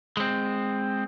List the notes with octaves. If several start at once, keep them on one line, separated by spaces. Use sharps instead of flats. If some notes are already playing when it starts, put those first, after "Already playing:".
G#3 C4